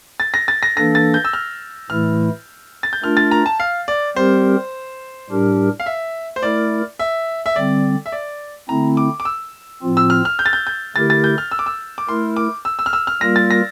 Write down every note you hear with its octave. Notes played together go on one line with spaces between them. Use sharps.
A6
A#6
A6
A#6
E3 A#3 D4 A4 A#6
A6
G6
E6
F6
A2 E3 A3 E4 F6
A6
G6
A3 D4 F4 A#4 F6
A6
A#5
A5
F5
D5
G3 C4 G4 A#4 C5
A2 G3 D4 G4 A#4
F5
E5
C5
A3 E4 A#4 D5
E5
E5
D3 G3 C4 D5
E5
D5
D3 A3 C4 E4 A#5
D6
D6
E6
A2 F3 C4 F4
E6
F6
F6
G6
A6
G6
G6
D3 A3 E4 G4 A#4 A6
A6
G6
F6
E6
D6
E6
D6
A3 E4 A#4 C6
D6
E6
E6
F6
E6
F6
G3 A#3 F4 A#4 A#6
A6
A#6